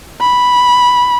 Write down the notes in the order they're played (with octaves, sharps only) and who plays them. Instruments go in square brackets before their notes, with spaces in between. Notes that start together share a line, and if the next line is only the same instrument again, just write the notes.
[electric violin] B5